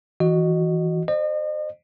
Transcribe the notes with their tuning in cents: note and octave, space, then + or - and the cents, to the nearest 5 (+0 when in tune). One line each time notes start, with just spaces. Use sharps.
E3 -10 F#4 +0 D#5 -15
C5 +0 D#5 -40